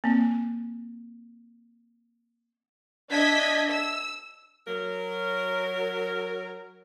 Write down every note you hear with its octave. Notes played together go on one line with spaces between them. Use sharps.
A#3 C4
D4 D#5 E5 G#6 B6
E6
F#3 A#4